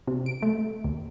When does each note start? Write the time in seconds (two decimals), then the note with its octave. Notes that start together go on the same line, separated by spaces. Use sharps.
0.07 C3
0.26 D7
0.43 A3
0.84 D#2